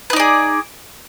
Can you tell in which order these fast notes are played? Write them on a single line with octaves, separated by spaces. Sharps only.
B4 D#4 D5 G#4